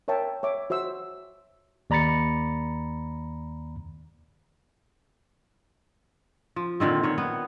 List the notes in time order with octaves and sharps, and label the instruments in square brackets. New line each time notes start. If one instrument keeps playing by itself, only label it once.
[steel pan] A#4 C#5 E5 G5 A5
C#5 E5 D6
F#4 C5 E5 E6
[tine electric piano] D#2 D5 A#5 B5 A6 C#7
[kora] F3
A#2 D3 D#3 C4
D#3 C#5
B3